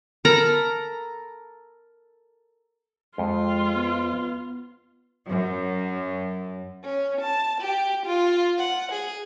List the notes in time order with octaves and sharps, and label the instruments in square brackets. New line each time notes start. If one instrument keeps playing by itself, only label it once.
[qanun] A4 A#4 A#5 B5
[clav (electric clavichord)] F2 [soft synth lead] G#3 [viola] F4
[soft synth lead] B3
[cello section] F#2
[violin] C#4
A5
G4
F4
F#5
G#4